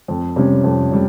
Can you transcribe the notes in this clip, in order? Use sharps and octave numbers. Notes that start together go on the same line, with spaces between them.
F2
C3 G3 C#4
F2
C3 G3